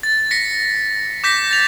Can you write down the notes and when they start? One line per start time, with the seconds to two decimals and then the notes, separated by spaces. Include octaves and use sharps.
0.03 A6
0.31 A#6 B6 C#7
1.24 D6 G6 A#6 B6
1.51 A6 F7